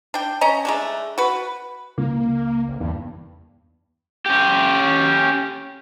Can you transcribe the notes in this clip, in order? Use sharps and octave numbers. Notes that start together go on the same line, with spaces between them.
D4 G5
C#4 D#5 A#5
G#3 A3 D4
F#4 B4
C#2 A#3
A1
E2 G2
C#4 G4